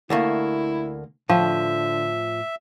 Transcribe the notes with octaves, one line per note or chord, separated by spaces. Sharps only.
D2 A3 A#3 E4
A2 D3 F3 E5